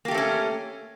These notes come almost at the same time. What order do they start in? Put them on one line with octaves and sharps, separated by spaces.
A#3 G4 A3 C4 C#4